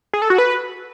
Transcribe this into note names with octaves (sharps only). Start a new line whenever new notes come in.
G#4
A4
F#4
B4